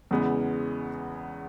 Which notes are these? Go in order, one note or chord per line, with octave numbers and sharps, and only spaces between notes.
E2 C#3 E3 G#3 B3